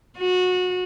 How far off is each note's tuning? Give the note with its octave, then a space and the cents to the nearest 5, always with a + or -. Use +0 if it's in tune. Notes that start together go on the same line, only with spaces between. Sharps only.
F#4 -25